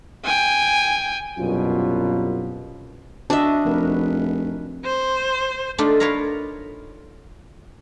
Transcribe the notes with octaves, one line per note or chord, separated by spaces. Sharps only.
G5 G#5
C2 F#2 B2 F#3 F4
D4 F#4 D#5 E5
F1 F3 A#4 B4
C5
A3 D4 D#4 F4 A4
F4 A#4 B4 C#5 F5 A#5